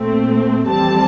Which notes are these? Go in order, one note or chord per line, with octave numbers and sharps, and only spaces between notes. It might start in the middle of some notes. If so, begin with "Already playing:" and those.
Already playing: A#2 A3 C4
F2 E3 G3 C4 A5